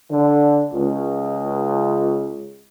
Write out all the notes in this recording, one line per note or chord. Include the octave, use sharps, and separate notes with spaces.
D3
C#2